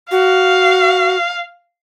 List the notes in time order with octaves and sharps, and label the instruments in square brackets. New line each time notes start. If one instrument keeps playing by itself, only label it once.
[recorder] F#4 [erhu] F5